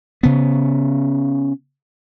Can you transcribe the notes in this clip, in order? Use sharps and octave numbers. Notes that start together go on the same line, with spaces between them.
C#3 B3